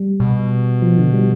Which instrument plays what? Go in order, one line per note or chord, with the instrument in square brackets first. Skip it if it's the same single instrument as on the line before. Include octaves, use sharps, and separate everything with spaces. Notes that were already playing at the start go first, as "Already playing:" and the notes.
Already playing: [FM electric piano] G3
[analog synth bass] B2
[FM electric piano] F3
D3
G3